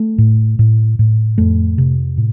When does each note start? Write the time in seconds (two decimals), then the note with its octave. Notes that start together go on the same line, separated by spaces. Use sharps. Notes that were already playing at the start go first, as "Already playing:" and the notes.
Already playing: A3
0.18 A2
0.59 A2
0.99 A2
1.38 F2 A3
1.78 C3
2.17 A2